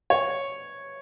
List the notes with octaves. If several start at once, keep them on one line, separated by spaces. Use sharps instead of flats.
C#5